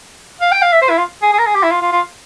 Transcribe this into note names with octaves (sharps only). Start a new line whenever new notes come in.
F5
G5
F5
E5
C5
E4
F4
G#4
G#4
A#4
G#4
G4
E4
F4
F4
F4